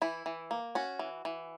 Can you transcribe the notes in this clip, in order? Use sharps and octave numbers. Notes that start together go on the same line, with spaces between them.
E3 E4
E3
A#3
C#4 F#4
E3
E3